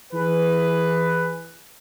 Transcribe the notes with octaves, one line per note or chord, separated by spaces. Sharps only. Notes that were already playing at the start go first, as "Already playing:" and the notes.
E3 G#4 B4